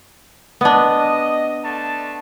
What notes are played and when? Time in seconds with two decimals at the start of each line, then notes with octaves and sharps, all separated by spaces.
0.61 B3 D4 D#5
1.63 D3 A3 A5